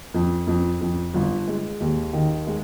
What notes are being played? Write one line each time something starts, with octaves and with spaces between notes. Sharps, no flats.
F2
F2
F2
G1
G#3
D#2
D#3
G#3